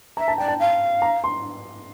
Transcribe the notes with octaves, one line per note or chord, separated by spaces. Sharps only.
E5 A#5
A5
D5 G5
A5
F5
A#5
C6